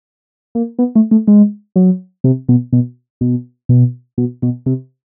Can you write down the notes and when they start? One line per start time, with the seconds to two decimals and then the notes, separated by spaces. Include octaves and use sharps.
0.55 A#3
0.79 B3
0.95 A3
1.11 A3
1.28 G#3
1.76 F#3
2.24 C3
2.49 B2
2.73 B2
3.21 B2
3.69 B2
4.18 B2
4.42 B2
4.66 C3